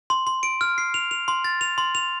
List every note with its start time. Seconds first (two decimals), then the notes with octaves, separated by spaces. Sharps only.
0.10 C6
0.27 C6
0.43 D7
0.61 F6
0.78 C7
0.94 F7
1.11 F7
1.28 C6
1.44 A6
1.61 F7
1.78 C6
1.95 F7